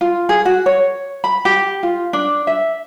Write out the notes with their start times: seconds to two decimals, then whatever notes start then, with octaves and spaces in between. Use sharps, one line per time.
0.01 F4
0.29 G#4
0.45 F#4
0.66 C#5
1.24 B5
1.45 G4
1.83 F4
2.13 D4
2.47 E5